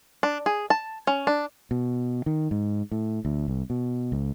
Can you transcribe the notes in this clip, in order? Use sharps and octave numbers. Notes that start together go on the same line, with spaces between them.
D4
G#4
A5
C#4
D4
B2
D#3
G#2
A2
D2
C2
B2
C#2